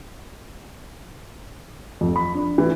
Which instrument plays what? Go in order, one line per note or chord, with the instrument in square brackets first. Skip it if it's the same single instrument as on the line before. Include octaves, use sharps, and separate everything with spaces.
[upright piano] F2
B5
D4
E3